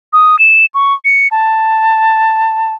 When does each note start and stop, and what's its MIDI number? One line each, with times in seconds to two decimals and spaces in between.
0.13 0.39 87
0.39 0.65 100
0.74 0.94 85
1.05 1.28 97
1.31 2.74 81